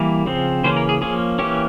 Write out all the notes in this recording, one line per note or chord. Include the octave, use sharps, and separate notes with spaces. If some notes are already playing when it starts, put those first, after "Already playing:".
Already playing: E3 G3 A#3
C#3 F3 C4
C#3 E3 A#3 C#4 C5
A#4
G#4
F3 A#3 C#4 G#4
E3 A#3 C#4 G4